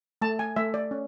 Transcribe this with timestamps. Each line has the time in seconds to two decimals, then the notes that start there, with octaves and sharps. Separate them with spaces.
0.22 A3 A5
0.39 G#5
0.56 A3 E5
0.74 D5
0.91 C#4